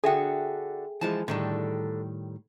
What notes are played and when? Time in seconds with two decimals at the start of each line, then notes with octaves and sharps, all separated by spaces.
0.04 D3 F#4 G#4 A4 E5 G5
1.01 E3 F3 G#3 A5
1.28 A2 D3 D#3 G3 A5